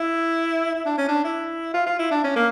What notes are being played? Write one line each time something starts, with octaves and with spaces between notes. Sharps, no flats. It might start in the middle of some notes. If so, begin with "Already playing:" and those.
Already playing: E4
E4
D4
C#4
D4
E4
F4
F4
E4
D4
C#4
A#3